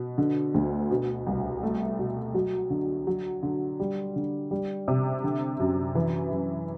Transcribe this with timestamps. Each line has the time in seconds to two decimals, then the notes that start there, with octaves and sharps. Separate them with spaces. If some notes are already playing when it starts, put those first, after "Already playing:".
Already playing: B2
0.18 D3
0.54 D2
0.90 B2
1.26 C2
1.63 A3
1.99 B2
2.34 F#3
2.70 D3
3.07 F#3
3.43 D3
3.80 G3
4.16 D3
4.51 G3
4.88 C3
5.24 D3
5.60 F#2
5.95 E3
6.32 F#2